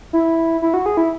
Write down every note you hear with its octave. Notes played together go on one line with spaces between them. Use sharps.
E4
E4
F#4
G#4
E4